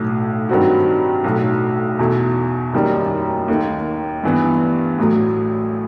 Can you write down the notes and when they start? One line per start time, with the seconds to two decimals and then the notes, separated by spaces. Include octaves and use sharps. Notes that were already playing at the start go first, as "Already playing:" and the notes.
Already playing: B1 A2 F#3
0.49 G2 D#3 F#3 C4 F#4
1.24 B1 A2 F#3
1.99 E2 B2 A3
2.73 F#1 F#2 D#3 G3
3.48 D#2 D#3 A3
4.23 G2 E3 B3
4.98 A1 A2 F#3